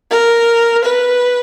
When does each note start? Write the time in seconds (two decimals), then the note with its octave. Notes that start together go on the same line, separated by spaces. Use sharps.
0.11 A#4
0.84 B4